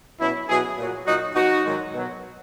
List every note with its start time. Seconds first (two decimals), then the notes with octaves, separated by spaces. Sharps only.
0.19 B2 F#3 C#4 E4
0.48 B2 F#3 E4 G#4
0.77 A#2 F#3
1.06 A#2 F#3 D#4 F#4
1.35 B2 F#3 D#4 F#4
1.64 G#2 D#3 F#3
1.93 B2 F#3